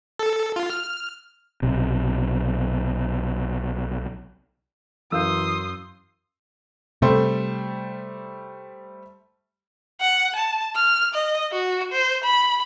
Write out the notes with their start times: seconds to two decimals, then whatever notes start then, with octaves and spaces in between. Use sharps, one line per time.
0.19 A4
0.56 F4
0.70 F6
1.62 B1 C3
5.12 F#2 E3 F5 C6 D#6 E6 G6
7.02 C3 G3 A3 C5
10.01 F#5
10.36 A5
10.76 F6
11.14 D#5
11.52 F#4
11.92 C5
12.24 B5